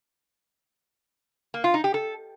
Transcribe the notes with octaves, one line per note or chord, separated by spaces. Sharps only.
A#3
F4
D#4
G4
A4